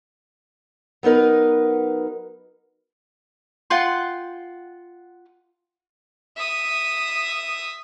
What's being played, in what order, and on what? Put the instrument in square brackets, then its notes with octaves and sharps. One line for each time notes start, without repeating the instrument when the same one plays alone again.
[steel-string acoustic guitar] F#3 B3 D#4 A#4 B4
[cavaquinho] F4 F#5 G5 C6
[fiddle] E5 D#6